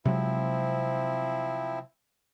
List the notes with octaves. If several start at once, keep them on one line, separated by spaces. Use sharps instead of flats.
C3 F3 F#3 G#3 C4 E4